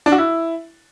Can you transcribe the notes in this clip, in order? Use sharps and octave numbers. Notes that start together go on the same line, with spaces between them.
D4
F#4
E4